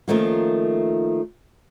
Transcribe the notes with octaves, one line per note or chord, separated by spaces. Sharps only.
D#3 F3 A3 A#3 C#4 F4